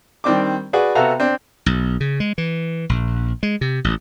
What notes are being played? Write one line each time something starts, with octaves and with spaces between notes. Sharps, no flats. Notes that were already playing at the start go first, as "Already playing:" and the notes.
D#3 G3 C4 D4 D6
F#4 G#4 B4 D5
C3 B3 F#4 A4 F5 A#5
C4 D4
B1
C#3
G#3
E3
A#1
G#3
C3
A1